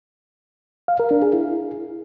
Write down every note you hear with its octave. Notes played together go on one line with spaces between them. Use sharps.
F5
A#4
D4
G#4
E4